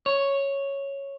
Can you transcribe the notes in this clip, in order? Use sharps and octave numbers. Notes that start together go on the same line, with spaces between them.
C#5